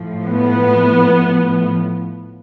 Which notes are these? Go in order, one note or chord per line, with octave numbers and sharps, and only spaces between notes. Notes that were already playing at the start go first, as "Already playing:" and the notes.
Already playing: A2 F3
B3